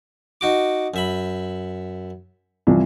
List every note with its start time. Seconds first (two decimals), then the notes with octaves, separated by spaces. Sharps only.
0.41 D#4 F#4 D6
0.94 F#2 E5 B5
2.67 C2 E3 F3